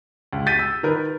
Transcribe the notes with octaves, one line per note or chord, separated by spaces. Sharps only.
C#2
G6 A6 B6 D#7
E6
D#3 A#4 B4